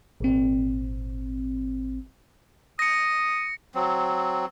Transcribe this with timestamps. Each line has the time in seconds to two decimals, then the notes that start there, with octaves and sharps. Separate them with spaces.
0.20 G#1 A#2 C4
2.79 D#6 A#6 C#7
3.75 F#3 C4